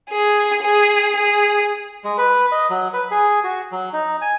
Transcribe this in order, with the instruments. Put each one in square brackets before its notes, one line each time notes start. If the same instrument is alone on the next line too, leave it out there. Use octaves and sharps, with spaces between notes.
[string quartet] G#4
G#4
G#4
[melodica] G#3
B4
D#5
F#3
B4
G#4
F#4
F#3
D#4
G#5